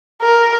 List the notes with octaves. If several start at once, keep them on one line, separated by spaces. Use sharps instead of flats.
A#4